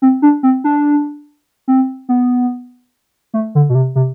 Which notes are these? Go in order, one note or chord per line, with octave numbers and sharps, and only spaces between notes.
C4
D4
C4
D4
C4
B3
A3
D3
B2
C3
C3